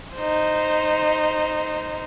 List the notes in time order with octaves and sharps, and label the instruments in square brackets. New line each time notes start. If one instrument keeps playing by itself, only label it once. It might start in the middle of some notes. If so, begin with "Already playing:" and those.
[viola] D#4 C5